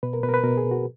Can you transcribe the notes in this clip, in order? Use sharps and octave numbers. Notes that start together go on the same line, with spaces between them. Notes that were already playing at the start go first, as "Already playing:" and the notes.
B2 B4
A#4
B2 B4
A#4
B4
B2 A#4
G#4
B2
F#4